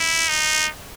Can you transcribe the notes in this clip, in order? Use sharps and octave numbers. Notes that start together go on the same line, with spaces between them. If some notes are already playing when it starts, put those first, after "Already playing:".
Already playing: E4
D#4